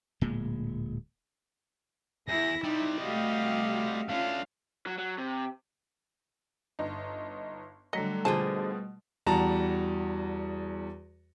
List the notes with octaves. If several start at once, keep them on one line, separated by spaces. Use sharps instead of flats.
D1 A#2 G#3
E2 E4 A#6
G3 C4 D#4
A3 F#4 G4 D#5 F5
A3 C#4 D4 F4 F5
F#3
F#3
C3
G1 D#4
D3 F#3 G3 A3 D#5
B2 D3 F3 G#3 G#4 C5 A5
E2 G3 F#4 A5 A#5